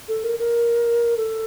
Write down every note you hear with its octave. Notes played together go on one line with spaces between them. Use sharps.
A4
A#4
A#4
A4